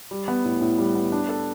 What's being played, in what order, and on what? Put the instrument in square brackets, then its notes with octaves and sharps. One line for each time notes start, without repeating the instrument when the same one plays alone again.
[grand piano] G3
B3
A2
A2
G3
B3
D4
A4